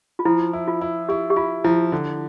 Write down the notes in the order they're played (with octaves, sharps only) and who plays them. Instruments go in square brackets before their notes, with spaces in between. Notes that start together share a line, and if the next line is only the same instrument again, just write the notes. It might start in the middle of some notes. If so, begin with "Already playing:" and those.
[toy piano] F4
[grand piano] F3 [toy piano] E4
[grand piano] E4
[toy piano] F4
[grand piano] E4
[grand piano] E4 [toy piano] G4
[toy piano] G4
[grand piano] E4 [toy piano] F4
[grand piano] F3 [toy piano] E4
[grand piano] D3